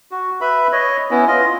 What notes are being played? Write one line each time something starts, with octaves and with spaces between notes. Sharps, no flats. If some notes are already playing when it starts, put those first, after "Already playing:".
F#4
B4 E5 B5
C#5 D#5
B3 C#4 E4
F4 D#5